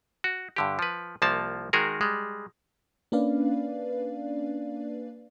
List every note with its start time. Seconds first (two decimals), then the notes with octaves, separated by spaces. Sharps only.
0.24 F#4
0.56 G2 D3 G4
0.79 F3 B4
1.22 C2 F3 A#3 A5
1.73 D#3 G#3 F#4 G#4 A#4
2.01 G3 G#3
3.12 A#3 C#4 D4 B4 D5 F5